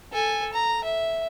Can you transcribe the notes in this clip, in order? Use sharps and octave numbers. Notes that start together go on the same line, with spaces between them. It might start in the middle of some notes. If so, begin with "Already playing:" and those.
A4 G#5
A#5
E5